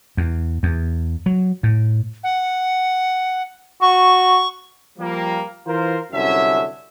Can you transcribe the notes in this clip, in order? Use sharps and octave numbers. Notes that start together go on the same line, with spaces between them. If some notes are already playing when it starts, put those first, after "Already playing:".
E2
E2
F#3
A2
F#5
F#4 C#6
F3 G3 A#3
E3 F4 A#4 C5
C2 F#2 D3 C#4 E5